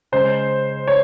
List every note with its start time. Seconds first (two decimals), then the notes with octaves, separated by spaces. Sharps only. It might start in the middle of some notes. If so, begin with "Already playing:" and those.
0.12 C#3 G#3 C5
0.88 C#5